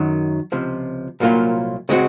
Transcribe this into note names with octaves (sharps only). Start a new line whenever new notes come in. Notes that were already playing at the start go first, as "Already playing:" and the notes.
Already playing: F#2 D#3 F#3
C#2 C3 F3
C2 A#2 F#3 A#3 F4
C#3 G#3 C4 F#4